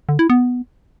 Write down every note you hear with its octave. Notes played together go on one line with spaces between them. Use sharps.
D3
E4
B3